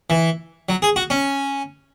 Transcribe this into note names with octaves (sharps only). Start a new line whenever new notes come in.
E3
F#3
G#4
F#4
C#4